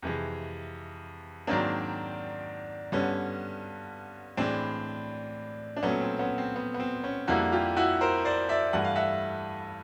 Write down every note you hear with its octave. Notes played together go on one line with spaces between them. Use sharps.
F2 C3 E3 G#3
G#2 D#3 F#3 A#3 C4 D4
G2 D3 G3 B3 C#4
A2 E3 G#3 C4 D4
D4
A#2 F#3 A3 B3 C#4
C4
B3 C#4
C4
B3
B3
C4
B3 C#4
F2 D3 G3 A#3 E4 F#4
F4 G4
E4 F#4
A#4 C5
C5 D5
D5 E5
G2 E3 A3 F#5
F5
E5 F#5